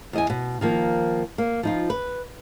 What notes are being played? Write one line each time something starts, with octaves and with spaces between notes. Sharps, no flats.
E2 D#5 G#5
B2
D#3 F3 A#3
A#3
F3 D#4 F4
B4